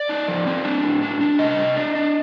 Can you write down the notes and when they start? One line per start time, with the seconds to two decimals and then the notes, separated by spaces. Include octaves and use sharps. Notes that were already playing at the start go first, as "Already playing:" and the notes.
Already playing: D5
0.09 D#4
0.28 F3
0.46 C4
0.65 D4
0.83 A2
1.02 D4
1.21 D4
1.39 C3 D#5
1.57 C3
1.76 D4
1.95 D4